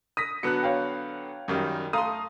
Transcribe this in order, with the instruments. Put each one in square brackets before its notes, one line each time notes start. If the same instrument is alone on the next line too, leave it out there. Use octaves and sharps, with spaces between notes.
[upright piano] D#6 A#6 B6
[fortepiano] D3 F#3 B3 [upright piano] F#6 C#7
[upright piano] C#5 F5 G5
[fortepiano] F#2 D#3 G3
[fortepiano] A3 C6 [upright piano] F5 A#5 D#6